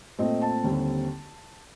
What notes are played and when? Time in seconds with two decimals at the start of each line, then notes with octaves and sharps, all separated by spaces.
0.19 A#2 A3 C4 D#5
0.41 A5
0.64 D#2 D3 G3 C4